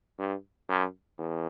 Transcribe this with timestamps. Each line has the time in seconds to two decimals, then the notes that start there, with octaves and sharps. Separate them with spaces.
0.19 G2
0.69 F#2
1.18 E2